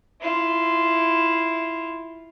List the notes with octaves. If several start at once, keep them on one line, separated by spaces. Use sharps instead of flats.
E4 F4